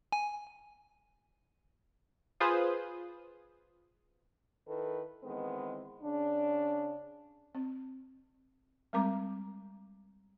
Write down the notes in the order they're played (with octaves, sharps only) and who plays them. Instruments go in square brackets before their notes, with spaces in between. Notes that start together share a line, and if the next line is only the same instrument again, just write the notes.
[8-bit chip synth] G#5
[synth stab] F4 G#4 B4 C5 D#6
[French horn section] D#3 E4 A4 B4
D#3 E3 G#3 B3 C4
C#3 D4
[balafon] C4
G3 G#3 C4 A#4 A#5 D6